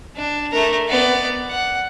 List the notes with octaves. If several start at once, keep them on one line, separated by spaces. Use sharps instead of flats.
D4
A3 A#4
B3 D5
F#5